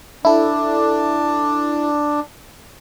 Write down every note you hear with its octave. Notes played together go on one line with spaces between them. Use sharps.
D4 E4 A4